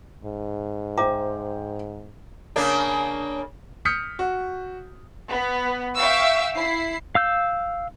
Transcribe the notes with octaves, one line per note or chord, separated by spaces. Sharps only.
G#2
C5 E5 G5 A#5 D6
C#3 A#3 D4
D#6 F6 G6 B6 C#7
F#4
B3
E5 F5 G5 C#6 E6
E4 C7
F5 E6 G6